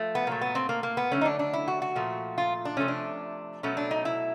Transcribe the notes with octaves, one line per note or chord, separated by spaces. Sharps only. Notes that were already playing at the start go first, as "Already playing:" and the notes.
Already playing: F3 A3
B3
A#2 F#3 A3 A#3
B3
C4
A#3
A#3
B3
D3 F#3 A3 C#4
D#4
D4
D4
E4
F#4
F#4
A#2 F3 A3
F4
D4
C3 F3 A3 C#4
D4
B2 F#3 A3 C#4
D4
D#4
E4